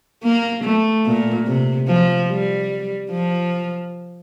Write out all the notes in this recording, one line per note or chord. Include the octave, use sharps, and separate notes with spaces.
A#3
A3
A#2
C3
F3
G3
F3